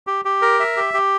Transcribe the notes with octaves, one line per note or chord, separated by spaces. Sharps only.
G4
G4
A#4
E5
G4
G4